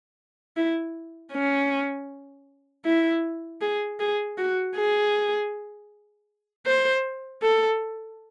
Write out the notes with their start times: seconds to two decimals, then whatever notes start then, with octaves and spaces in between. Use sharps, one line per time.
0.57 E4
1.33 C#4
2.86 E4
3.61 G#4
4.00 G#4
4.38 F#4
4.76 G#4
6.67 C5
7.43 A4